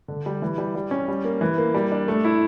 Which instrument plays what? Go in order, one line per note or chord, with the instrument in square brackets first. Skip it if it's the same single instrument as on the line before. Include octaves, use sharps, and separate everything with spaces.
[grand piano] D3
G3
E3
G3
G3
C#4
G3
A#3
E3
A#3
G3
D4
A3
E4